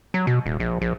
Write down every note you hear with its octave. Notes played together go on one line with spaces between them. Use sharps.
F#3
B2
D#1
A#1
A#1